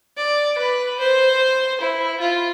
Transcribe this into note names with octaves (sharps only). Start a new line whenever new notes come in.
D5
B4
C5
E4
F4